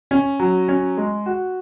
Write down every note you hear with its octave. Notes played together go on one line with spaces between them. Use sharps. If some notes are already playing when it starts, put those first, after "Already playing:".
C#4
F#3
C#4
G#3
F#4